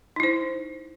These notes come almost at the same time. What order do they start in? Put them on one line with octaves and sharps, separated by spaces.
D#4 E4 C5